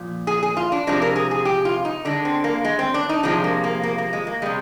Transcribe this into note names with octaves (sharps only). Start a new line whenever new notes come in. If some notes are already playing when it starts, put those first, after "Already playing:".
Already playing: A#2 F3
G#4
G#4
F4
D4
C3 F3 G#3 D4
A#4
G#4
G#4
G4
F4
D#4
D3 G#3 D4
C4
A#3
G#3
C4
D4
D#4
C3 F3 G#3 D4
A#3
A#3
A#3
A#3
G#3
A#3
C3 G3 G#3